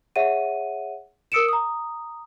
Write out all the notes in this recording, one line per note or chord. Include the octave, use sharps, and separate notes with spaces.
G#4 C#5 E5 F#5 D#7
A#4 D#6 E6 C#7 D7 E7
A#5 D#6